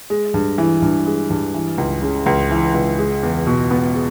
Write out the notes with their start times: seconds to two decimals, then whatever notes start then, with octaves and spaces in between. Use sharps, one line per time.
0.10 G#3
0.34 G2
0.58 E3
0.82 G2
1.06 G#3
1.30 G2
1.54 E3
1.78 C#2
2.02 C#3
2.26 C#2
2.51 E3
2.74 C#2
2.98 G#3
3.23 E2
3.47 B2
3.71 B3
3.95 G#3